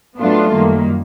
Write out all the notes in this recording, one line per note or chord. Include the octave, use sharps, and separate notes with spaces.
A2 F#3 A3 B3 D4 F4
F#2 D#3 G3 A#3